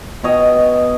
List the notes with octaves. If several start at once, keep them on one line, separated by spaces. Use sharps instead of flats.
B2 C#5 D#5 G5